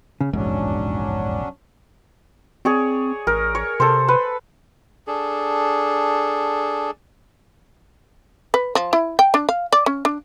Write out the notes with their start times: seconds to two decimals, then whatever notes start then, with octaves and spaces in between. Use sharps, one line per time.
0.21 C#3
0.33 F1 A#1 E2 G#2 F#3 C#4 D4
2.65 C4 G#4 C#5 D5
3.27 A1 A#4
3.55 C#5
3.80 C3 A4 C5
4.08 B4
5.07 D4 G#4 A4
8.54 B4
8.75 F3
8.93 E4
9.19 G5
9.34 D4
9.49 F5
9.72 D5
9.86 C#4
10.05 D4